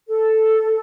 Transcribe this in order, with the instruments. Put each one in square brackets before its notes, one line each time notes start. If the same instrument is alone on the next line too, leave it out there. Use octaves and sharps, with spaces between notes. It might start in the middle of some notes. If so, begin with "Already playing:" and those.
[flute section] A4